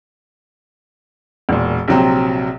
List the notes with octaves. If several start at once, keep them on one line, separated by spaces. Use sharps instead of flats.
E1 A#2
A#1 C3 F#3 C4